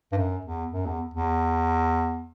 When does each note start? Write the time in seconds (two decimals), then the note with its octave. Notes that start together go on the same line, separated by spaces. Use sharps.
0.12 G2
0.17 F#2
0.45 E2
0.72 F#2
0.86 E2
1.14 E2